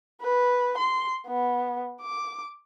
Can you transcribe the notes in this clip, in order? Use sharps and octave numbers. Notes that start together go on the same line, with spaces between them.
B4
C6
B3
D6